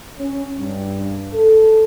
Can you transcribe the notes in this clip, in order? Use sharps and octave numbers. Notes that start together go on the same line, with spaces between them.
C#4
G2
A4